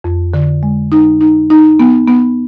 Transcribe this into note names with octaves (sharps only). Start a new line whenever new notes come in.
F2
D3
G#3
D#4
D#4
D#4
B3
B3